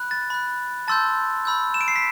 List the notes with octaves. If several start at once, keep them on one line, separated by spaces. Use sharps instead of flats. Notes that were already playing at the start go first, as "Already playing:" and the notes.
Already playing: B5 F#6
A6
B5 F#6
A5 C6 E6 G6 A6
B5 E6 G6
E7
D7
C7
B6